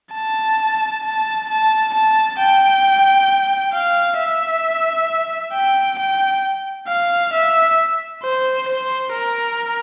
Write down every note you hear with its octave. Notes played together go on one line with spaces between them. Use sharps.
A5
A5
A5
A5
G5
F5
E5
G5
G5
F5
E5
C5
C5
A#4